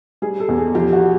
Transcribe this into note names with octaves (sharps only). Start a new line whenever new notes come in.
G3 G#4
A4
E2
G#4
F3 G4
F#4